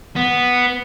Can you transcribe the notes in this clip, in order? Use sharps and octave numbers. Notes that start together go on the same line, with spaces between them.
B3